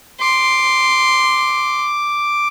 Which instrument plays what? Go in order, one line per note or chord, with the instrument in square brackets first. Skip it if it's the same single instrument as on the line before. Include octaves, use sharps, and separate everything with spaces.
[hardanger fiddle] C6 [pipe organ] D6